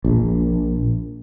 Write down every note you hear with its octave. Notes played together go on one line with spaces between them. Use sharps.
A#1